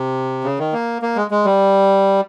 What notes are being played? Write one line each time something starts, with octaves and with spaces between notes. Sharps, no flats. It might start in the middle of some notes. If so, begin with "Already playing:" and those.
Already playing: C3
C#3
D#3
A#3
A#3
G#3
G#3
G3